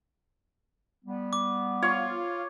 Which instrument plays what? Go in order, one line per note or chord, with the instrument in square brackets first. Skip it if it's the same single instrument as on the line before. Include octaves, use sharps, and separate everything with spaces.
[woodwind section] G3 B3
[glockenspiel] D6
[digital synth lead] F4 [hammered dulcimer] C#5